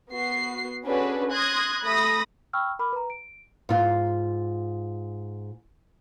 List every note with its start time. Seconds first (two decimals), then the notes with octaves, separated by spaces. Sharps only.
0.11 B3 F#4 C7
0.86 C#4 D4 F#4 G#4 A4 B4
1.32 C6 D#6 F#6 G#6 A#6
1.83 A3 B5 D#6 A#6
2.53 G5 B5 C#6 E6 F6
2.79 A#4 B5 D6 F6
2.93 B4 A#5
3.10 D7
3.69 G#2 F4